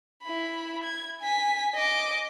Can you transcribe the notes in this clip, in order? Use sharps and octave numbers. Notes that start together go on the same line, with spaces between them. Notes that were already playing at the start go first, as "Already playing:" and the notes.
E4 B5
G#6
G#5 B6
D#5 D6